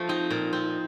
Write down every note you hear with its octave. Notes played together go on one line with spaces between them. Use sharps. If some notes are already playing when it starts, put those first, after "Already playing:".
Already playing: F3 A3
C4 D#4
A#2
C4